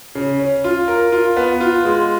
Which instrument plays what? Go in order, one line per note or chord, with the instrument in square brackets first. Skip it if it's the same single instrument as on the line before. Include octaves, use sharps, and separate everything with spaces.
[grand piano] C#3
C#4
F4
A#4
F4
B3
F4
G#3